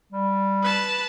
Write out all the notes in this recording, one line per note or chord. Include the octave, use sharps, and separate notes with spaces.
G3
B4 A5